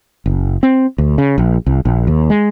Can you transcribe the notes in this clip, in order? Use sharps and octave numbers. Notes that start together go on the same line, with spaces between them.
F#1
C4
D2
C#3
A#1
C2
A#1
D#2
G#3